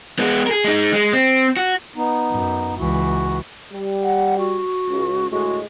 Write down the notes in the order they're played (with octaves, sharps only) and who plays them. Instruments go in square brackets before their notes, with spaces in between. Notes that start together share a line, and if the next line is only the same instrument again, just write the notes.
[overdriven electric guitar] G#3 B3
G#4 A#4
G#3 D#4
G#3
C4
F#4
[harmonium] B3 D#4
[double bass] F#2
[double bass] C#2 E3 [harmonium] F#4
[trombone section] G3
[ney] F#5
F#4
[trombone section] C#2
[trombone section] D2 A2 G#3 [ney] F#4